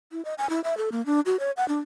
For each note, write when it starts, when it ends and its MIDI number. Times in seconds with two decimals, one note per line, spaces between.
0.12 0.24 64
0.25 0.34 75
0.38 0.50 80
0.50 0.61 64
0.64 0.77 76
0.77 0.89 69
0.92 1.05 58
1.06 1.21 62
1.26 1.39 66
1.40 1.51 73
1.57 1.68 78
1.68 1.79 62